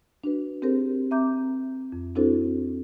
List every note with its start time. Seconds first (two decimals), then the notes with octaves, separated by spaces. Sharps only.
0.24 D4 F#4 B4
0.62 C4 G4 G#4 A#4 C5
1.11 C4 E5 A#5 D6 G6
1.92 F2
2.15 C4 D4 E4 F#4 A4 C5